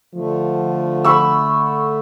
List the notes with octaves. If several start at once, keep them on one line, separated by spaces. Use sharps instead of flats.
D3 F3 A3
B5 C#6 E6